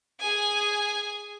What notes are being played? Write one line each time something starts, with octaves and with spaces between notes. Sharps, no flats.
G#4 G#5